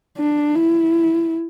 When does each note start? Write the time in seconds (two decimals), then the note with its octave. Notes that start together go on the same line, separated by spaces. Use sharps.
0.18 D4
0.55 E4